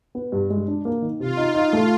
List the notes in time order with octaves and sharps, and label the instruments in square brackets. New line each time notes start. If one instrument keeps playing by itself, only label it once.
[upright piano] B3
G2
G#3
D4
A#3
D#3
[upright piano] C3 [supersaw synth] F4
[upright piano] D#4
D#4
A3